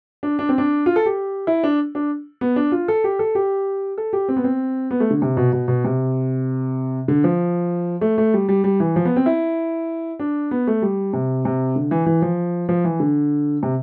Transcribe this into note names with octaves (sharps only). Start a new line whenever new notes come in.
D4
D4
C4
D4
F4
A4
G4
E4
D4
D4
B3
D4
F4
A4
G4
A4
G4
A4
G4
C4
B3
C4
B3
A3
D3
C3
B2
B2
B2
C3
D3
F3
A3
A3
G3
G3
G3
E3
F3
B3
C4
E4
D4
B3
A3
G3
C3
C3
D3
E3
E3
F3
F3
E3
D3
C3